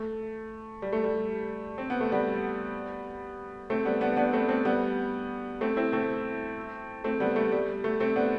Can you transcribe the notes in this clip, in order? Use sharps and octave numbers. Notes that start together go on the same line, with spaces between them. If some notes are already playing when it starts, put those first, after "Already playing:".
Already playing: A3
G3
A3
G3
C4
B3
A3
G3 B3
A3 C4
G3 B3
B3 D4
B3 D4
A3 C4
A3 C4
G3 B3
A3 C4
C4 E4
A3 C4
A3 C4
G3 B3
A3
G3
A3
A3 C4
B3 D4